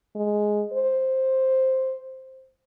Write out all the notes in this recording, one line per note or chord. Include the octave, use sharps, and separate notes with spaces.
G#3
C5